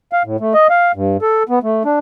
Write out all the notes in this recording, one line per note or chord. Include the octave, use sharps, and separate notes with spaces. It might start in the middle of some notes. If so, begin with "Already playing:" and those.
F5
A2
A3
D#5
F5
G2
A4
B3
A3
D4